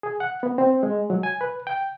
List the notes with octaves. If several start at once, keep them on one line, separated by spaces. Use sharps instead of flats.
G#4
F#5
B3
C4
G#3
F#3
G#5
B4
G5